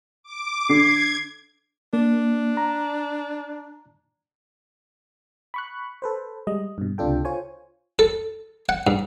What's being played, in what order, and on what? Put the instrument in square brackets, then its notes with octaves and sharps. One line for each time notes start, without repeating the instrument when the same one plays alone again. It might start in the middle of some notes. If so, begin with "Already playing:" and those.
[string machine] D6
[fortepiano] D3 [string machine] G#6 [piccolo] C7
[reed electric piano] A#3 [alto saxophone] D4
[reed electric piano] A#5
[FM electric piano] B5 C#6 F#6
A4 B4 C5
G3 G#3 D#5
G2 B2
C#2 C3 D4 F4 A4 G5
F4 C5 C#5 G#5
[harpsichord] A4
F#5
G2